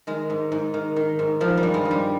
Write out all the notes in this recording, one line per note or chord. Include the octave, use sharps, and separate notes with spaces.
D#3 G#3
G#2
G#2
D#3
D#3
G#2
D#3 F3
G3
G2
G#3
G2
G3